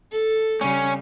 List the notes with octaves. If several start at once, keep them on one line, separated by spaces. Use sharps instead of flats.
A4
C#3 G3 C#4